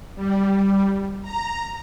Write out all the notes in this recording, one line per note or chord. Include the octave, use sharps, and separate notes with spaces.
G3
A#5